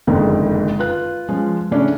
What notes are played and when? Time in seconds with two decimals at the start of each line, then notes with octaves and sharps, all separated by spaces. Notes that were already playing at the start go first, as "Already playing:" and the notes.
0.07 F#1 F2 G#2 D3 D#3
0.79 F4 B4 F#6
1.28 F3 G#3 C#4
1.71 A2 C#3 C#4 D4